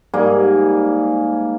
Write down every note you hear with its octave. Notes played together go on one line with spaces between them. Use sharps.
G#2 G3 A#3 G#4